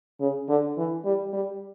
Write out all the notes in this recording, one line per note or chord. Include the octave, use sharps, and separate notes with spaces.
C#3
D3
E3
G3
G3